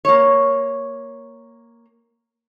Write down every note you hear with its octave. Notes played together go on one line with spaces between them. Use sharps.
A#3 C#5